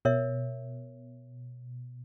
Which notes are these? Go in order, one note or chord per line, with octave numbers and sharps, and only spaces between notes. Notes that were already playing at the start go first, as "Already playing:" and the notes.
B2 A#4 C#5 E5